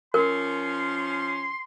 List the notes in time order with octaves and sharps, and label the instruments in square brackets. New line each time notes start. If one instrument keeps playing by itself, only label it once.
[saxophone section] F3 C#4 [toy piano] A#4 [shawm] C6